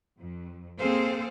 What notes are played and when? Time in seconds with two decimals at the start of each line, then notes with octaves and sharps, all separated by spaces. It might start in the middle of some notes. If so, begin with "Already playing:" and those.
0.19 F2
0.79 A#3 C4 G#4 A4 C5 F5